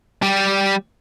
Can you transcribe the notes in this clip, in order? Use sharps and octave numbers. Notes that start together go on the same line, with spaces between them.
G3 G4